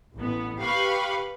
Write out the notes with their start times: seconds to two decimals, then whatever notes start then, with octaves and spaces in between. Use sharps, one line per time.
0.16 A1 B3
0.59 G4 B4 F5 B5 C#6